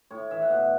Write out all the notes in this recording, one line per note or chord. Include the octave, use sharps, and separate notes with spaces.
A2 C#5
E3 E5
F#5
B2 E5